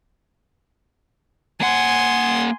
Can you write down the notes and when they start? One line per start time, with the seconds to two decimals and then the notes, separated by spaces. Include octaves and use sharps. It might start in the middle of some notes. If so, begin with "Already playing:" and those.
1.61 A#3 F#5 G#5 C6